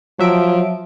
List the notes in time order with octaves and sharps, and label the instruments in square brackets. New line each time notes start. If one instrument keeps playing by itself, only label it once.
[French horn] F3 [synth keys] F#3 E5 D7